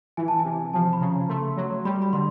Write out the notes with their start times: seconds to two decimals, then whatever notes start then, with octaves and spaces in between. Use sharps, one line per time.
0.17 E3 G#5
0.28 A5
0.39 G#5
0.45 C3
0.73 F3 A5
0.93 B5
1.01 C#3 A#5
1.29 A3 C6
1.57 F#3
1.85 G3 B5
2.02 B5
2.13 D3 C6